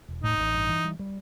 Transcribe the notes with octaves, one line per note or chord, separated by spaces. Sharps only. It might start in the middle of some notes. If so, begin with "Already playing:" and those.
E1
A2 D#4
A1
G2
E3
G3
G3